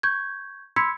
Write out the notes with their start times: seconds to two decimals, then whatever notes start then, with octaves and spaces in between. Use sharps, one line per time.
0.03 C#6 G6 G#6
0.76 B5 C6 E6 G#6 B6 C#7